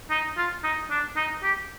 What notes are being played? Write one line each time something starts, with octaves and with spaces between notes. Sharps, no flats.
D#4
F4
D#4
D4
D#4
G4